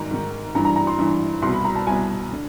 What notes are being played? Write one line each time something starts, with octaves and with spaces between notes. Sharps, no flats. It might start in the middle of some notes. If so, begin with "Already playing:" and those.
Already playing: G#2 D#3 A#5
G#2 D#3
G2 E3 A#5
A#5
A#5
C6
G2 E3
C2 B2 C6
B5
A#5
A5
C2 B2 G#5
D3